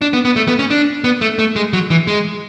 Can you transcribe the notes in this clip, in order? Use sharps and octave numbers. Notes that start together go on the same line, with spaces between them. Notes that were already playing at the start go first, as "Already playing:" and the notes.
D4
B3
B3
A3
B3
C#4
D4
B3
A3
A3
G#3
F#3
E3
G#3